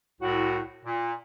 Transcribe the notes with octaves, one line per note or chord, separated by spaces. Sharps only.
C2 A2 F#4
A#2